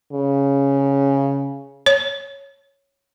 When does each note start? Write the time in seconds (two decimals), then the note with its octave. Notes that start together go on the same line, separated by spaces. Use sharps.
0.13 C#3
1.86 C#5